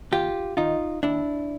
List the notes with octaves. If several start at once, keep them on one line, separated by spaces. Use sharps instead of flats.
D#2 F4 G4
D#3 D#4 F4
D#2 D4 E4